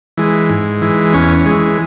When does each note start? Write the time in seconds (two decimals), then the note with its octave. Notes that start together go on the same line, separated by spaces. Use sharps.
0.17 E3 G#3
0.50 G#2
0.82 E3 G#3
1.14 E2 C#4
1.46 G#3
1.51 E3